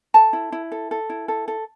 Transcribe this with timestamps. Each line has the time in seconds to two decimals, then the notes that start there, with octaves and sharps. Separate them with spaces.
0.14 A4 A5
0.33 E4
0.52 E4
0.72 A4
0.91 A4
1.10 E4
1.28 A4
1.48 A4